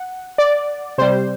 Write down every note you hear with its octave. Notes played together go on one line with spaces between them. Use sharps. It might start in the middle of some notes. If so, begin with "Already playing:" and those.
Already playing: F#5
D5
C3 G3 C5